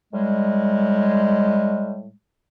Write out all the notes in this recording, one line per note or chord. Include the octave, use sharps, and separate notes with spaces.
A2 G3 G#3